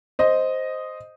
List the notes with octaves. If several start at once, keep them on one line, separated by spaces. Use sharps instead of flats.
C5 D#5